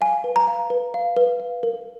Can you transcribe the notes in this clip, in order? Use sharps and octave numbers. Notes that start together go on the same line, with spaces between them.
F5 G#5
B4
A#5
F5
B4
F5
B4
F5
A#4